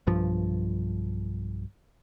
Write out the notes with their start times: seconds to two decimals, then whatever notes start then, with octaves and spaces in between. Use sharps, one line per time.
0.07 B1 G2 F3